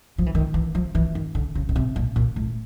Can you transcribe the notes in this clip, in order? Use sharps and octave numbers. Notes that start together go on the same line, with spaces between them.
F3
E3
D#3
E3
F3
E3
D#3
D3
C#3
B2
C3
A#2
A#2
A2